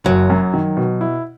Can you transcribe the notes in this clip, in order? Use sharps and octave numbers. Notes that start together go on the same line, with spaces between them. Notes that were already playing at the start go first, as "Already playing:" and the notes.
F#1 F#3
F#2
D#3
B2
E4